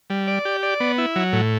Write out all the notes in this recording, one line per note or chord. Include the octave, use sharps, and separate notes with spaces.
G3
D5
G4
D5
B3
E4
F#3
A2